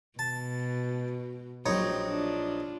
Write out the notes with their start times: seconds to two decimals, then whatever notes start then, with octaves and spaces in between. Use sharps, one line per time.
0.19 B2 A5
1.66 A#1 F#3 C4 D#4 C#5
2.07 D4 F4